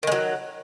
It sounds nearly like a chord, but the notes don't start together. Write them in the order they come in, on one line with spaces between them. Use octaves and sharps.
D#3 G#3 F#3